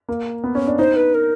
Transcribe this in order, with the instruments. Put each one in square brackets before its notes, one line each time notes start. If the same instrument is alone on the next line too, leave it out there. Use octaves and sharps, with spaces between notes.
[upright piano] A#3
B3
C#4
D4
[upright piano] D#4 [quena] C5
[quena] B4
A#4